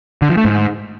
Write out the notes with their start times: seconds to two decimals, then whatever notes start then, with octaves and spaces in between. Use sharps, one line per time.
0.22 D3
0.29 F3
0.37 A3
0.45 G#2